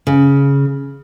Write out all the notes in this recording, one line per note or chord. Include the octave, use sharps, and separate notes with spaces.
C#3